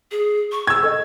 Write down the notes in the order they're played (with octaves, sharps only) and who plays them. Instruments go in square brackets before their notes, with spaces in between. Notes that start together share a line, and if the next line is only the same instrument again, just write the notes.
[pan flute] G#4
C#6
[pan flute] C#6 [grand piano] E6 G#6
[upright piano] A4 D#5